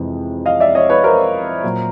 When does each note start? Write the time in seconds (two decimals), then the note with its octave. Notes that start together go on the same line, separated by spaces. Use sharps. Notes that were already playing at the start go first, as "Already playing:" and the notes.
Already playing: F2 C3 E3 G#3
0.46 D#5 F5
0.60 D5 E5
0.75 C#5 D#5
0.90 B4 C#5
1.04 A#4 C5
1.64 A#2 F#3